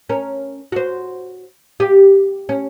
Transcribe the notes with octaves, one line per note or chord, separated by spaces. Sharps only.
C#4 A#4
F#4 C5
G4
C#4